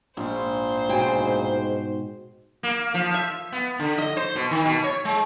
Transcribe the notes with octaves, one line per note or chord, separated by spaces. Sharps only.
A#1 G#2 C5
G#2 B2 G5 G#5
A#3
F3
E5
B3
D3
D#5
C5
B2
D#3
B2
C#5
G#3